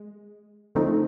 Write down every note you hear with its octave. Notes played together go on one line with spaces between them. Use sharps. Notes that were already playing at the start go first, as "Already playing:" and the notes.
Already playing: G#3
D3 F3 A3 C4 D#4